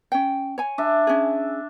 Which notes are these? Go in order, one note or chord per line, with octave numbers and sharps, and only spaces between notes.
C#4 G5
C#5 G#5
D4 E5
C#4 G#4